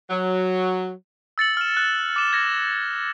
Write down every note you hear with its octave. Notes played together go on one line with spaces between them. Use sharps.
F#3
E6 A6 C#7 F#7
F6 E7
F#6
D6 E7 G7
G#6 A#6 C#7 E7